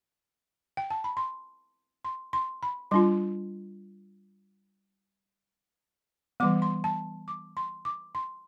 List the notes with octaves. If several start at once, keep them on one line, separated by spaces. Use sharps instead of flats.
G5
A5
B5
C6
C6
C6
B5
G3 D4 F4 C6
E3 G3 B3 D6
C6
A5
D6
C6
D6
C6